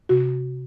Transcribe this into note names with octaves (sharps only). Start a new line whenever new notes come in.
C3 F#4